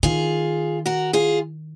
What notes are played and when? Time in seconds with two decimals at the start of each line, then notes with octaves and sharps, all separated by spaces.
0.03 D#3 F4 G#4
0.86 F#4 A#4
1.13 F4 G#4